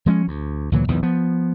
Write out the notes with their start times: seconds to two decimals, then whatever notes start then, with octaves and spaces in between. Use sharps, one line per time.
0.06 F3 G#3 C4 C#4
0.28 D2
0.72 D2 A#2 E3 F#3
0.88 B1 E2 A#2 D#3
1.03 F3 B3